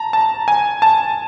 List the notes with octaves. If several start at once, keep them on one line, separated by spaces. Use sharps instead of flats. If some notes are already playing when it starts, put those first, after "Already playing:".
Already playing: A5 A#5
A5
G#5
A5